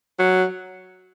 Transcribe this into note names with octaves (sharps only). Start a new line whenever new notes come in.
F#3